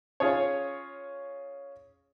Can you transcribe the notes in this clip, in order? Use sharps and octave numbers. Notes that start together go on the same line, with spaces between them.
C#4 F4 G#4 C#5